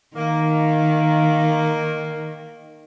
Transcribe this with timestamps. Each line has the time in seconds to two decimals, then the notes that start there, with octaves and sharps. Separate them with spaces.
0.16 D#3 A#3